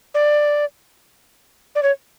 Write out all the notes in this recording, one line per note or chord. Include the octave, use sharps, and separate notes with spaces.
D5
D5
C#5